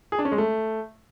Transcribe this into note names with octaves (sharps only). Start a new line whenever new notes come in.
G#4
D4
C#4
G#3
A3